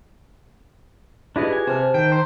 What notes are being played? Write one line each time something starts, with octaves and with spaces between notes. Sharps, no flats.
D4 E4 F4 G4 G#4 B4 D#5
G#5
C3 C5 A5 F6
D#3 G5
C5 A#5